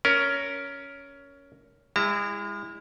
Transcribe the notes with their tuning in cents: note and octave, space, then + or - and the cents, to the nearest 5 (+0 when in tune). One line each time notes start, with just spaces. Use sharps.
C#4 +15 A#4 +0
G#3 -40 E4 +0 A#5 -40